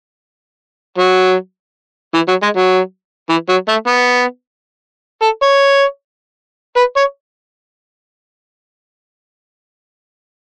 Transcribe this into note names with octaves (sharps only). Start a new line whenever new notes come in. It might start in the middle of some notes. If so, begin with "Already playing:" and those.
F#3
E3
F#3
G#3
F#3
E3
F#3
A3
B3
A4
C#5
B4
C#5